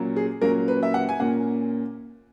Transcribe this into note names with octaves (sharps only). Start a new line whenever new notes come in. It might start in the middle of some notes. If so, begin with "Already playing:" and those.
Already playing: A#2 F#3 A#3 C#4
G#4
A#2 F#3 A#3 C#4 A#4
B4
E5
F#5
G#5
A#2 A#3 C#4 F#5